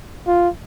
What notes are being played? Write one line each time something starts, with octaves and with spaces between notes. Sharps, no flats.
F4